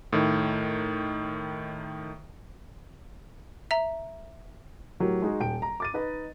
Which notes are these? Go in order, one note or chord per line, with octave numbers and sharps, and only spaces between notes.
A2 D#3
E5 A#5
A2 F#3 G4 A#4
G#3 D#4 F#4 G#4
D#1 G5 D7
A#5
D6 A6 D#7
D#4 B4 D#5